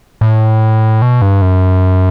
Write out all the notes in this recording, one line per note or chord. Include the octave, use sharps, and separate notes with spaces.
A2
B2
G2
F#2